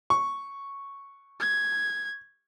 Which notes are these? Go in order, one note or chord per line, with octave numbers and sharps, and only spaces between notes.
C#6
G#6